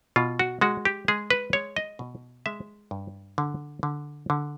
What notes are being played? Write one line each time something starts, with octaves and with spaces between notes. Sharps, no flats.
B2 F4
F#4
G#3 F#4
G4
G#3 G#4
B4
G#3 C#5
D#5
B2
G#3 E5
G2
D3
D3
D3